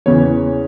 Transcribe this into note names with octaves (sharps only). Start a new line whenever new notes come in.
E2 C#3 E3 C#5